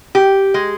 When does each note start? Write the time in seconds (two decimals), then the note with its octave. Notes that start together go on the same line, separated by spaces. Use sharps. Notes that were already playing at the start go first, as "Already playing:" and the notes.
0.15 G4
0.54 G#3